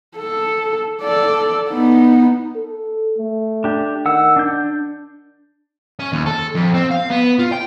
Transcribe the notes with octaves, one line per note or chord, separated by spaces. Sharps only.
A4
A4 D5
B3 D#4
A4
A3
D4 G4
D#3 F#5 E6
D4 G6
C#4
D#2
A4
F2
C4
F5
B3
F4
G5